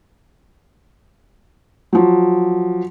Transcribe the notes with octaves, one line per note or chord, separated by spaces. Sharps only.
F3 F#3